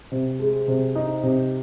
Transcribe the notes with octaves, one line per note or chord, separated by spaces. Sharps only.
C3
G#3
C3
D#4
C3